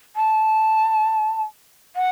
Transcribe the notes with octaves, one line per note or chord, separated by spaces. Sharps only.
A5
F#5